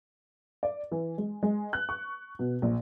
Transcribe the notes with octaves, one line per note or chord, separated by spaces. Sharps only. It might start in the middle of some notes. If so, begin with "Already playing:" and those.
D5
E3
G#3
G#3
F#6
C#6
B2
A#1